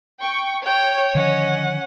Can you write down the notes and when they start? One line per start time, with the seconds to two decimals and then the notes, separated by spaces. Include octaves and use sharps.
0.21 G5 C#6
0.66 C#5 G5
1.15 D3 D#3 F3 C#4 D#5 F#5